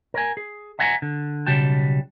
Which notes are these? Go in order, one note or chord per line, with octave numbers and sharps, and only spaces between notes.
A#4 G#5
G#4
E5 F#5 G#5 A#5
D3
B1 C#3 G3 F#4 G5 A5